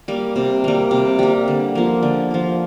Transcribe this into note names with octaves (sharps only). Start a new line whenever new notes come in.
G3 A#3
C3
G3 A#3
C3
G3 A#3
D3
F3 A#3
D3
F3 A#3